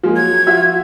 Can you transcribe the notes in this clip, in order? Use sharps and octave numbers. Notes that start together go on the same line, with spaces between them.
F3 G#3 A#3
F#3 G#6
F3 F#4 E5